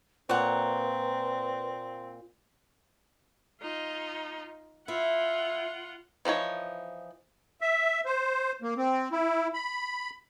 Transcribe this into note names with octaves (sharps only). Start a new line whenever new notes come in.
A#2 C4 B4 C#5 F#5
D#4 F4
E4 F4 F#5
E3 F3 D#4 C#5
E5
C5
A#3
C4
E4
B5